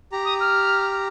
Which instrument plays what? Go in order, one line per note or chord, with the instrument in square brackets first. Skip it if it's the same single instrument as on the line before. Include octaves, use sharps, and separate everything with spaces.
[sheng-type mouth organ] G4 A#5
[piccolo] D#6
F6